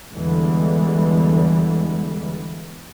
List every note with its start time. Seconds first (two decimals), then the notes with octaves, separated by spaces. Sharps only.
0.14 E2 D3 E3 G3 G#3